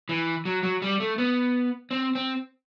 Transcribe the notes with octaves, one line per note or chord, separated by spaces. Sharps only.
E3
F#3
F#3
G3
A3
B3
C4
C4